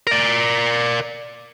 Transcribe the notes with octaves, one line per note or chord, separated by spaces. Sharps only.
A#4 D5